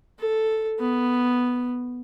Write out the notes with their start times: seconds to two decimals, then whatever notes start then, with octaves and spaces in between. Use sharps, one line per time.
0.19 A4
0.80 B3